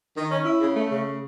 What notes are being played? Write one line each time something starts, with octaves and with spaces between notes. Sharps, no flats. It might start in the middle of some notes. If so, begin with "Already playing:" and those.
D#3
C#4
E4
C#3
A3
C#3